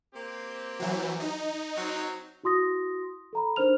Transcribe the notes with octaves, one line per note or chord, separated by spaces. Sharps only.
A#3 C4 G4
E3 F#3
D#4
F#3 C4
E4 F#4 C6 D#6 A#6
A4 A#5 B5
D4 D#4 A#4 C5 F6 F7